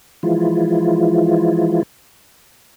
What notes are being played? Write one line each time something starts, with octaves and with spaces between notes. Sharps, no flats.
E3 F3 G#3 E4 F4